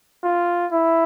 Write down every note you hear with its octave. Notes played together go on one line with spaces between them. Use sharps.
F4
E4